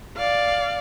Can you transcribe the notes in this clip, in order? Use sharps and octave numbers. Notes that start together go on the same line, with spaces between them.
D5 F5